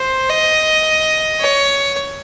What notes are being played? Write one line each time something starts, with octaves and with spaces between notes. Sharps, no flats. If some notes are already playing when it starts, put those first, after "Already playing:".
Already playing: C5
D#5
C#5